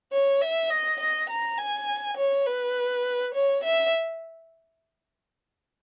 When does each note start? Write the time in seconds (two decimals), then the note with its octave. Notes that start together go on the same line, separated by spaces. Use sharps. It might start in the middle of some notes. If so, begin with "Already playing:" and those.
0.12 C#5
0.41 E5
0.70 D#5
0.99 D#5
1.29 A#5
1.58 G#5
2.16 C#5
2.46 B4
3.34 C#5
3.63 E5